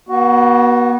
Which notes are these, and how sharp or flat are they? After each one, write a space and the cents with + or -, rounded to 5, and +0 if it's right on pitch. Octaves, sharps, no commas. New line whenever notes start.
B3 -40 F#4 +15